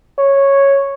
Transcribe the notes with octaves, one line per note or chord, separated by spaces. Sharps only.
C#5